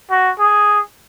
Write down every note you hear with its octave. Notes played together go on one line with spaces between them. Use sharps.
F#4
G#4